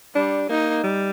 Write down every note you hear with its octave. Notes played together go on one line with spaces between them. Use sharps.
G3 D4
A#3 D#4
G3